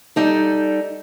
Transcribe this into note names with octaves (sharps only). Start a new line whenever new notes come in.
G3 D#4 A4